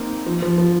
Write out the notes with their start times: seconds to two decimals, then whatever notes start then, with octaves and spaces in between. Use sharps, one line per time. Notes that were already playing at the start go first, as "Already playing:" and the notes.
Already playing: A#3 C4 D#4
0.26 F3
0.42 F3
0.58 F3